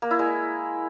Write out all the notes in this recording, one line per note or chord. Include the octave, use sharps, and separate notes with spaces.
A#3
E4
G#3